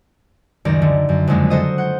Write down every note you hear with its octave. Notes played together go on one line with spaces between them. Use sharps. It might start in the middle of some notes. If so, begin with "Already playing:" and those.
C#2 F#2 D#3 D5 A#5
D3
F#2
F2 C#3 F#3 G#3 A#3 D4
F#4 A4 C5 D#5 D#6
F#5 G6